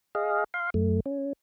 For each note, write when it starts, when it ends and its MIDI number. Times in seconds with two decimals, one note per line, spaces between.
0.15 0.44 68
0.15 0.44 75
0.15 0.44 77
0.54 0.70 77
0.54 0.70 84
0.74 1.00 42
0.74 1.00 57
1.06 1.33 61